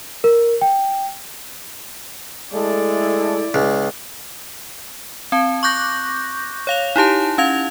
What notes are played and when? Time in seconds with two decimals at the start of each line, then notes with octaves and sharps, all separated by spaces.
0.24 A#4
0.61 G5
2.53 G#3 A3 E4 A4 D5
3.54 C#2
5.32 C4 A5
5.63 C#6 D6 F#6 G6 A#6
6.67 C#5 F5 F7
6.96 D#4 E4 G4 A5
7.38 C#4 F5 G#6 F7